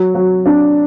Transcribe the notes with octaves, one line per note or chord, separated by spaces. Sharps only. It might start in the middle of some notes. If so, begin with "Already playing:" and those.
Already playing: F#3
F#3
D4